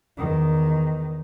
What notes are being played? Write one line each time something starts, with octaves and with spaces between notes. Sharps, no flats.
E2 D#3